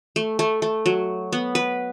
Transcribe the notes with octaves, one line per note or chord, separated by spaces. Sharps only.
A3
A3
A3
F#3
B3
B4